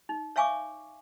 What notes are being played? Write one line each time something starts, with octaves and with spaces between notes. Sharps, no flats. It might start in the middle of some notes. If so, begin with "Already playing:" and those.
D#4
C#5 E5 F5 G#5 C#6 D6